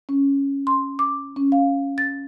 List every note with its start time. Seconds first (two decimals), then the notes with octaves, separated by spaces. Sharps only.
0.09 C#4
0.67 C6
0.99 D6
1.36 C#4
1.52 F5
1.98 A6